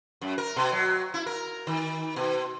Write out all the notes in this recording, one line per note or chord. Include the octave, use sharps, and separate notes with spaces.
F#2
A#4
B2
F#3
E4
A#4
D#3
B2